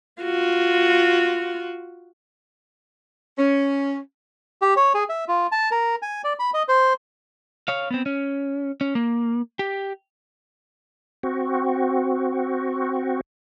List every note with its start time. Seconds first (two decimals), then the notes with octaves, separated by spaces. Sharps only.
0.22 F4 F#4
3.38 C#4
4.62 G4
4.76 C#5
4.94 G#4
5.09 E5
5.28 F4
5.52 A5
5.71 A#4
6.02 G#5
6.24 D5
6.39 B5
6.54 D#5
6.68 C5
7.68 C#5 F5
7.91 B3 C4
8.06 C#4
8.81 C#4
8.95 A#3
9.59 G4
11.23 C4 F#4